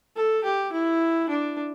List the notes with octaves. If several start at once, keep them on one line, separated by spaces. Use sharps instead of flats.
A4
G4
E4
D4